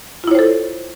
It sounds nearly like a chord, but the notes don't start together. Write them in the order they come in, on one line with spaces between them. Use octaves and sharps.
F4 E4 C#5 C5 A4